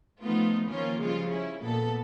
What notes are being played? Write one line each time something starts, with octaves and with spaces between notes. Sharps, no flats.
F3 A3 B3 D#4 F4
D#3 F3 A#3 C#4 F4
C#3 F3 G3 G#3 F4
C#4 E4
A#2 B3 A4